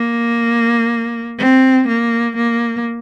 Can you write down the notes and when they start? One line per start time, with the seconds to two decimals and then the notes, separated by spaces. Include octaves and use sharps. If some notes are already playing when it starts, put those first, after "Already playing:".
Already playing: A#3
1.39 C4
1.88 A#3
2.36 A#3